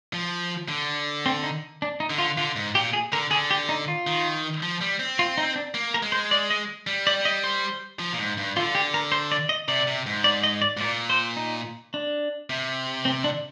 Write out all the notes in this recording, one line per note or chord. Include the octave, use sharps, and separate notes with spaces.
F3
D3
C4
D#4
D4
D#4
D3
F4
D3 F4
G#2
A#2 G4
G#4
D3 A#4
D3 G#4
G4
D#4
F4
D#3
F3
G3
C4
F4
D#4
D4
A#3
A#4
G#3
C5
D5
D#5
G3
D5
D#5
C5
F3
A#2
G#2
G2
D3 F4
G4
A#4
C5
D5
D#5
C3 D5
C3
G#2
D5
D#5
D5
G#2
A#2 D5
C5
D#4
D4
C3
C4
D4